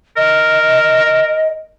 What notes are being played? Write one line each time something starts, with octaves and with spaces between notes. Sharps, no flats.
A#4 D#5